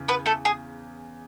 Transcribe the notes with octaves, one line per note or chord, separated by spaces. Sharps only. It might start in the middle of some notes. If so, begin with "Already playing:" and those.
Already playing: E2 C#3
B3 B4
A3 A4
G#4